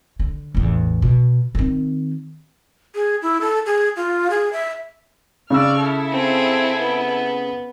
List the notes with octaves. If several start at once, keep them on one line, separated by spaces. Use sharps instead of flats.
D3
A1 E2
B2
D#3 C4
G#4
E4
A4
G#4
F4
G#4
E5
C#3 D5 C#6 E6 F6
E4 A4
C4 G#4
B3